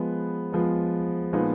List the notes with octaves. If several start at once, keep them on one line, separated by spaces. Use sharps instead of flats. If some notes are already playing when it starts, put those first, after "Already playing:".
Already playing: F3 G#3 B3
F3 G#3 B3
A#2 F3 G#3 B3 D#4